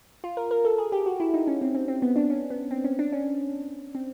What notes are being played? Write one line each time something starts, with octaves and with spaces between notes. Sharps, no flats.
F4
A#4
A#4
A4
G#4
G4
F#4
E4
D#4
C#4
C4
C4
C4
B3
D4
C#4
B3
C4
C#4
D4
C#4
C4